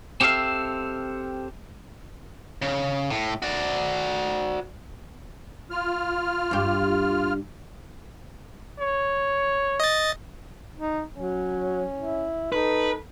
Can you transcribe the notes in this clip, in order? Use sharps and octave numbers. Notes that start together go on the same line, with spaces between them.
C4 G4 A4 E5 F5
C#3
A2
F#4 D5
F4 F6
G2 G4
C#5
D#5 A6
D#4
F#3 C#4
E4
D#4 A4 B4